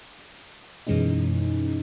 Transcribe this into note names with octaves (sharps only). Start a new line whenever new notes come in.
F#2 B2 E3 G#3 C#4 D#4